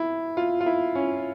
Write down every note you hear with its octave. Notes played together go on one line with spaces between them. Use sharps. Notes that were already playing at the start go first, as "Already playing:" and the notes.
Already playing: E4
F4
F4
E4
C#4